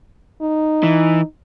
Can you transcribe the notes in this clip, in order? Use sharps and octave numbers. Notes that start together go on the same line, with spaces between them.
D#4
E3